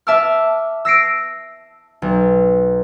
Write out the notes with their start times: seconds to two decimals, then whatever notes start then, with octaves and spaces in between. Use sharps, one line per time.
0.07 E5 A5 D6 E6 F6
0.85 E6 A#6 C7 D7
2.02 B1